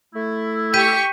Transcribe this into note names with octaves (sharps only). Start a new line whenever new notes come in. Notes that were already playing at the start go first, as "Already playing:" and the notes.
A3 E4
G4 C#6 G6 B6 D#7